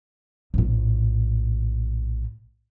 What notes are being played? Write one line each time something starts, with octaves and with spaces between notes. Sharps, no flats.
A#1 A2